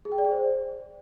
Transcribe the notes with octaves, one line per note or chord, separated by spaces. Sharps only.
G#4
G5
D5
G#4
C5